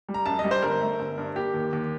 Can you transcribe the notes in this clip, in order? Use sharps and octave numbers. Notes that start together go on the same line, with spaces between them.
G3
A#5
F#2 A5
D#5
G3
C5
G1 A#4
A3
G1
G2
A#3 G4
D#2
D#2